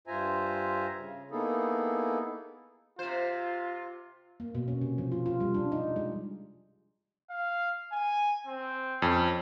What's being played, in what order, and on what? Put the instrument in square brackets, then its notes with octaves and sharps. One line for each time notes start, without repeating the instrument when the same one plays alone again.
[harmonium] G2 F4 C5 E5 G#5 A#5
C#3
A#3 B3 D#4 E4 G#4 A4
[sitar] C3 C5 [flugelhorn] F4
[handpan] A#3
B2
C#4
C3
F3
F4
F4
G3
D4
D#4
G#3
[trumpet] F5
G#5
C4
[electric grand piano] F2 [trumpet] C#4